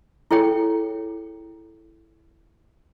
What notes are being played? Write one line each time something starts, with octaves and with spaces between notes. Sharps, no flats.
E4 G#4 A4 C#5 G5